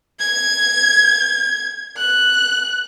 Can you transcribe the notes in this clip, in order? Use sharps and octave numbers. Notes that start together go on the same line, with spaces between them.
G#6
F#6